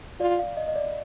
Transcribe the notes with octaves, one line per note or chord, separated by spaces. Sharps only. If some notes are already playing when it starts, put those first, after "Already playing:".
F4 D5
F5
D#5
D#5
D5